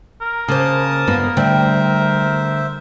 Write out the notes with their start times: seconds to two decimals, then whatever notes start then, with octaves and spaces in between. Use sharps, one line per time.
0.21 A#4
0.48 C#3 A#3 C5 A5 D#6
1.07 G2 A#3 B3
1.37 D3 G3 A3 C5 E5